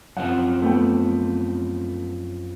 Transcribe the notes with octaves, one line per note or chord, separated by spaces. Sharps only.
F#2 F3 C4 F#5
A3 B3 G5